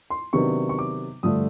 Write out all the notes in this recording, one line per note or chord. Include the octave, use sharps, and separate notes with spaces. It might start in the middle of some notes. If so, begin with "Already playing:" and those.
C6
C3 D#3 F#3 B3 D4 C#6
C#6
D6
G2 D3 F3 A3 D4 D#6